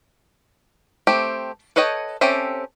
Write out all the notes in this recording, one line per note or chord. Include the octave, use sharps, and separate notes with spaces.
A3 C4 G4
A4 B4 C#5 D#5 G5
C4 C#4 G4 A4 E5